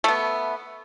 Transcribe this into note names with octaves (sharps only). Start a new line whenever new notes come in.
A3 B3